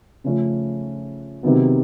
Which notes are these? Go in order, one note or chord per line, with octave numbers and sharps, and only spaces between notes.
C#3 F3 A3 C#4
C3 D#3 F#3 B3